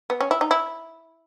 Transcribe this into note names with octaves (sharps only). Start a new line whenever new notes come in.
B3
C#4
E4
D#4
E4